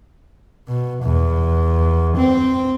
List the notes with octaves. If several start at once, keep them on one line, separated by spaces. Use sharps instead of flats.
B2
E2
C4